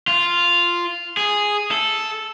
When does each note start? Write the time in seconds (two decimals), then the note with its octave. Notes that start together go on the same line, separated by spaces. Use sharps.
0.08 F4
1.17 G#4
1.71 A4